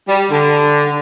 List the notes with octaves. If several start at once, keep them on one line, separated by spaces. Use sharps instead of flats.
G3
D3